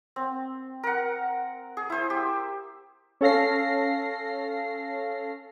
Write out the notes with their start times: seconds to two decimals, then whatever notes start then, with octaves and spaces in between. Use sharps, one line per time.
0.16 C4
0.83 A#4 F#5
1.77 G#4
1.90 E4 C5
2.10 G4
3.21 C#4 A4 F5 A#6 C7